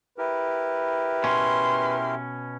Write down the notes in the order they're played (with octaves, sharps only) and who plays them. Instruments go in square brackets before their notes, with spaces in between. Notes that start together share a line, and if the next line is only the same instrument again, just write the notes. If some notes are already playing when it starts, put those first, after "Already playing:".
[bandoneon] E4 G4 A#4 [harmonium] B4
[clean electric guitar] B2 C#4 [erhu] C6